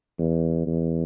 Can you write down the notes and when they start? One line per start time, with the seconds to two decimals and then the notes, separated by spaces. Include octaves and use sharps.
0.19 E2
0.67 E2